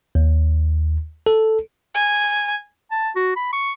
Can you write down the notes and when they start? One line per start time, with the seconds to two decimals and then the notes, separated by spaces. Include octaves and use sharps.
0.15 D#2
1.26 A4
1.95 G#5
2.91 A5
3.16 F#4
3.36 B5
3.53 C#6